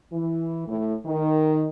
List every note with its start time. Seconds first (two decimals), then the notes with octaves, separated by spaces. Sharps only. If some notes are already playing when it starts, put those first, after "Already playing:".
0.12 E3
0.68 A2
1.06 D#3